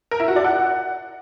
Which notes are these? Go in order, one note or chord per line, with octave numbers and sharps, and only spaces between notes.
A#4
E4
F#4
D5
F#5